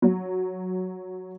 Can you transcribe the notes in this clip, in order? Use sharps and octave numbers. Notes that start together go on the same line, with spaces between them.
F#3